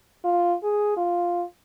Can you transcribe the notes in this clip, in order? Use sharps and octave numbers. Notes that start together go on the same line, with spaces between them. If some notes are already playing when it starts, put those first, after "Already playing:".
F4
G#4
F4